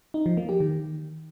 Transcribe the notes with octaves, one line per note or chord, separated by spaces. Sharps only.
D#4
F3
A#3
G4
D#3